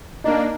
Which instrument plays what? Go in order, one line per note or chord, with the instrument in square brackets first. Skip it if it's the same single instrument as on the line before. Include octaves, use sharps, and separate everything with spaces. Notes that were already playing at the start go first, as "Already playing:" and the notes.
[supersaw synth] A#3 D4 [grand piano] D#4